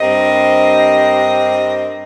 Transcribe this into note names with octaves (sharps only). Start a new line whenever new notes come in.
G2 C4 G4 A#4 C5 D#5